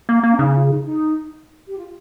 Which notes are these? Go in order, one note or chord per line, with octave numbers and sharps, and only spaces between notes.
A#3
A#3
C#4
C#3 D#4
F4
D#4
D#4
G4
F4